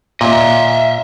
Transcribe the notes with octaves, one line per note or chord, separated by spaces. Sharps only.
A#2 D#5 E5